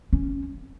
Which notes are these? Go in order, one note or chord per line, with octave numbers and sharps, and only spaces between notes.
C#4